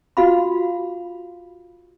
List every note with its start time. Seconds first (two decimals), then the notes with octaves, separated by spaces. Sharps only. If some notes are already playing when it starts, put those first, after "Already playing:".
0.17 F4 F#4 F5 B5